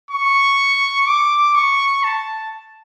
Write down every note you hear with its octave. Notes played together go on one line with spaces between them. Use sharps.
C#6
D6
C#6
A5